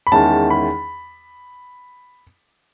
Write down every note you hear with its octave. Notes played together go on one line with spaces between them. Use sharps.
B5
E2 D#3 G#3 C#4 E4 A5
B5